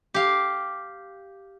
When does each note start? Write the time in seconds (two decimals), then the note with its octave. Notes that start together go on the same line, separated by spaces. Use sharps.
0.14 G4 F5